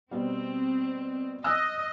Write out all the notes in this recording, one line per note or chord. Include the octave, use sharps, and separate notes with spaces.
B2 G3 C4
D#5 E6 F#6